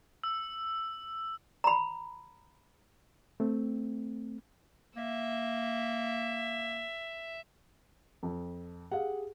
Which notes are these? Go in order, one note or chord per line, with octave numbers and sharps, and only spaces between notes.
E6
A#5 B5
A3 C4
A#3 E5
F2
G4 G#4 F5 F#5